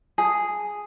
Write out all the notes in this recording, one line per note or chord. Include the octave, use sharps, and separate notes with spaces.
G#4